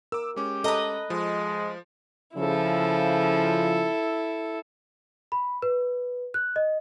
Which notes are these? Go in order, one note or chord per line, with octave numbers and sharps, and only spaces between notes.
A#4 D6 E6
G#3 C#4 G4
A4 B4 D#5 A#5
F3 G#3
C#3 F3 E4 A4
B5
B4
F#6
D#5